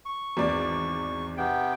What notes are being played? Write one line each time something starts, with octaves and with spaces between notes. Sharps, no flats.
C#6
G#1 E2 D5
C3 B3 G5